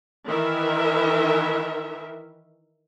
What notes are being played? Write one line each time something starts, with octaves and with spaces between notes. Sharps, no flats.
D#3 E3 A#4 E5